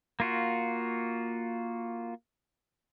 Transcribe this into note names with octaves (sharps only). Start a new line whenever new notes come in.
A#3 F4 F#4